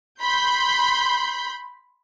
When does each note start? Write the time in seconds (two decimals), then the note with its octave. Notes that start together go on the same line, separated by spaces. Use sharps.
0.21 B5 C6 G6